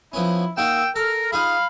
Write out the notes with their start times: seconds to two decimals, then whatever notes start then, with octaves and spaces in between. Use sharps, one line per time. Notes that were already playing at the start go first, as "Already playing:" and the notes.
0.13 F3 B3 C#4 E4
0.57 A#3 D#4 F#4 G5 E6
0.96 A4 A#4 F6
1.32 D#4 F4 G#4 F5 B5